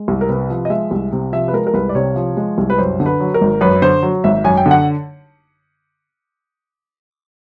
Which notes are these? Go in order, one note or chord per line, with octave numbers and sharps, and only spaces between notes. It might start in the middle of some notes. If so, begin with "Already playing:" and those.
Already playing: G#3
C2
A#4
C3 B4
F3
D#5
G#3 E5
C2
C3
F3 E5
B4
G#3 A#4
A#4
C2 B4
D5
C3 C#5
F3
G#3
C2
B4
F#2 C5
D3
B4
F#3
A#4
G#1
F#2 B4
D3 C5
F#3
G#1 E5
F#2 G#5
G5
D3
F#5